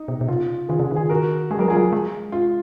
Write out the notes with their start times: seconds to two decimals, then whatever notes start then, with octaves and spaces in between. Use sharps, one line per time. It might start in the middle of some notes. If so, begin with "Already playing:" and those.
Already playing: D#4
0.08 B2
0.21 B2
0.28 C#3 F4
0.69 D#3 F4 G#4
0.79 C#3 F4 G#4
0.91 D#3
0.96 F4 G#4
1.10 F#4 A#4
1.51 G#3 G#4
1.59 F#3 A#4
1.68 F3 F4 G#4
1.77 F#3
1.93 G#3
2.32 F4